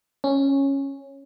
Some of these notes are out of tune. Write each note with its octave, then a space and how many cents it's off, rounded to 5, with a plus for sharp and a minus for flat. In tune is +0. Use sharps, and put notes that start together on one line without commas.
C#4 -10